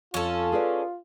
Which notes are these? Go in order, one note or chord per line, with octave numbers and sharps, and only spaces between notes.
F2 C#4 F4 A4
G#4 B4 D5